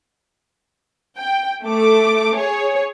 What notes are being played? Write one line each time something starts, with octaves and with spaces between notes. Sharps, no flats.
G5
A3 D6
G#4 C#5